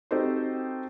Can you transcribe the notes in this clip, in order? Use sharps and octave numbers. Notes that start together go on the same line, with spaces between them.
C4 D#4 F#4 G4 A4 C5